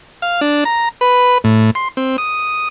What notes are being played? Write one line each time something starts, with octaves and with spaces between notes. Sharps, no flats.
F5
D4
A#5
B4
A2
C6
C4
D#6